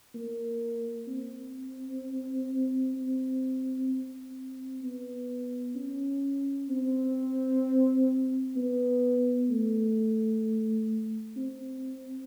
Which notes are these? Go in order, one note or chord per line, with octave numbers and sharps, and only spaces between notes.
A#3
C4
C4
C4
B3
C#4
C4
B3
A3
C4